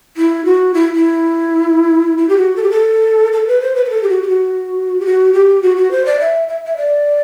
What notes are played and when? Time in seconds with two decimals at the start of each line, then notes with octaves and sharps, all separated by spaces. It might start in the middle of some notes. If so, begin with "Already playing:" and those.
0.17 E4
0.45 F#4
0.74 E4
0.96 E4
2.18 E4
2.29 G4
2.37 F#4
2.56 A4
2.63 G4
2.70 A4
3.33 A4
3.47 B4
3.62 C5
3.75 B4
3.85 B4
3.90 A4
4.03 G4
4.09 F#4
4.22 G4
4.28 F#4
5.00 G4
5.05 F#4
5.33 G4
5.62 F#4
5.76 F#4
5.91 C5
6.05 D5
6.20 E5
6.48 E5
6.66 E5
6.77 D5